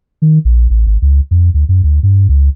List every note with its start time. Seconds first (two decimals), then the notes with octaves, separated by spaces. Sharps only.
0.22 D#3
0.45 A#1
0.70 A1
0.87 G#1
1.02 C#2
1.31 F2
1.54 D2
1.69 F#2
1.84 D2
2.03 G2
2.29 C#2